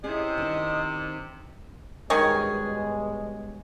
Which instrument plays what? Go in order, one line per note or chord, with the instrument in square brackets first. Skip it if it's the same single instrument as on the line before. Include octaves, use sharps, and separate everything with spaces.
[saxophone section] C3 [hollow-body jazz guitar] C#4 E4 [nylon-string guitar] G#4 [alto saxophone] D#5
[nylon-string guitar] D#3 D4
[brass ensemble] G2 B2 G#3 [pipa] D#3 C#4 G#4